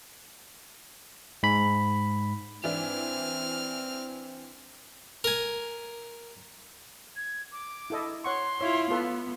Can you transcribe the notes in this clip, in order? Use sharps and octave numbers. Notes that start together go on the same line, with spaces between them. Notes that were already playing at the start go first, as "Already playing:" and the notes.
G#2 B5
E3 C4 D4 E4 F6
A#4 G#5
G#6
D6
E4 A4 D#5
C#5 F#5 C6 C#6
E4 F4 C#5
B3 F4 A4 B4